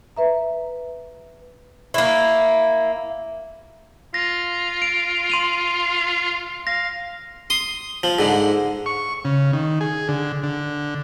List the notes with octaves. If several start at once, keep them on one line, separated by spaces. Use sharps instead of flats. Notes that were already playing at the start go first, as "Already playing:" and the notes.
B4 E5 A#5
A#3 E4
F4 A#6
D7
C6 D#7 F7
F5 A#6
C6 D#6
F3
G#2 D3
C#6
C#3
D#3
G#4
D3
D3